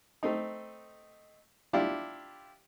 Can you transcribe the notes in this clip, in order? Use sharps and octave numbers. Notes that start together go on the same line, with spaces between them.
A3 C4 D#4
D4 E4 F4 G4 D5